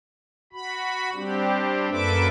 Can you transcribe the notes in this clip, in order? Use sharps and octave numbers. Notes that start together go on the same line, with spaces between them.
F#4 B5
G3 C4 D4 G4
F#2 A#3 A4 B4 E5 D6